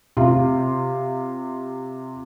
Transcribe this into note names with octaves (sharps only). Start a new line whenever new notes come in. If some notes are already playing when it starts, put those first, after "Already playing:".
C3 F4